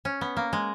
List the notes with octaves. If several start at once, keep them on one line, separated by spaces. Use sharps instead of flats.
C#4
B3
A#3
G#3